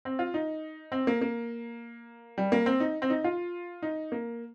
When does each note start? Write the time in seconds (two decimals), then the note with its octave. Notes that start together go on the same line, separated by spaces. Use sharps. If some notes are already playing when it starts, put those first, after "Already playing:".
0.05 C4
0.19 F4
0.34 D#4
0.92 C4
1.07 A#3
1.21 A#3
2.38 G3
2.52 A#3
2.66 C4
2.80 D#4
3.02 C4
3.10 D#4
3.24 F4
3.82 D#4
4.12 A#3